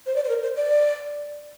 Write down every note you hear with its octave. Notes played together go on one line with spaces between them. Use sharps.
C5
D5
C5
A#4
C5
D5